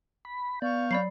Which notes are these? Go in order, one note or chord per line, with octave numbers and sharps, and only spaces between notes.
B5
B3 D5 F5 C#6 G6
F#3 D5 B5 C7